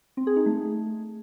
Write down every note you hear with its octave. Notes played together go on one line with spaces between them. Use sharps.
C4
G#4
D#4
A3